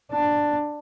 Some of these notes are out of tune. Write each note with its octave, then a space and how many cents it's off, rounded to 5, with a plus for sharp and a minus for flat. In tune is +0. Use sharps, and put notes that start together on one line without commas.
D4 +10